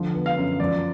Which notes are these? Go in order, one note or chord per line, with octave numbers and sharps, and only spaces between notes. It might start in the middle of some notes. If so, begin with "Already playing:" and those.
Already playing: D3 F3
B3
F5
F#2
F3 D5